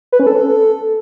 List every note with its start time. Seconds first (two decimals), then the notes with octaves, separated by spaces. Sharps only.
0.12 B4
0.20 C#4
0.27 A4